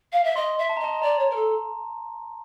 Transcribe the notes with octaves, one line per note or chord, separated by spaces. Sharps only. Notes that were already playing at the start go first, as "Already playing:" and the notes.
F5
E5
D#5 C6
E5
A5
A#5
D#5 A5
D5 A#5
C#5
A#4
A4